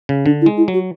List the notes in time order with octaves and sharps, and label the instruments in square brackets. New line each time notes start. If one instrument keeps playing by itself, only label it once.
[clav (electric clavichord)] C#3
[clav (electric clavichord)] D3 [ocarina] D4
[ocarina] E4
[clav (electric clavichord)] G#3
[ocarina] E4
[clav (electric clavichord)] F#3
[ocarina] F#4